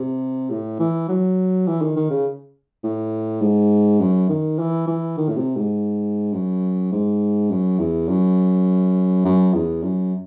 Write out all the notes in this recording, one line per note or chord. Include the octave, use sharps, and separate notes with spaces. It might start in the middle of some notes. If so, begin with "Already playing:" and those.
Already playing: C3
A2
E3
F#3
E3
D#3
D#3
C#3
A2
G#2
F#2
D#3
E3
E3
D#3
A2
C3
G#2
F#2
G#2
F#2
E2
F#2
F#2
E2
F#2